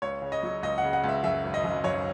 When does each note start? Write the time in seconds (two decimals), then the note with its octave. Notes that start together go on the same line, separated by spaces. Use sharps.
0.02 C#2 C#5
0.22 C#3
0.32 D#5
0.43 F#3
0.63 C#2 D#5
0.78 F#5
0.83 C#3
0.93 F#5
1.04 C#2 E5
1.24 F#2 E5
1.43 G#1
1.54 D#5
1.64 F#2
1.84 F#2 C#5